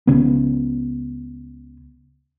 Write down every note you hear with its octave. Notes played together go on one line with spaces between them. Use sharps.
C#2 C#3 B3